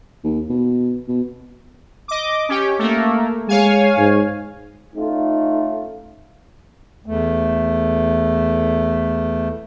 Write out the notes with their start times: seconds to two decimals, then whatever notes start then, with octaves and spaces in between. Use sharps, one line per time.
0.24 D#2
0.49 B2
1.08 B2
2.08 D#5 D6
2.49 C#4 G4
2.79 A3 A#3
3.48 G#3 C#5 F5 G#5
3.97 G#2
4.95 A3 C#4 D#4 F4
7.06 E2 A3